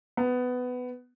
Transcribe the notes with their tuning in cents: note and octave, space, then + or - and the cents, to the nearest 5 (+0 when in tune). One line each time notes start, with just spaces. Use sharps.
B3 +15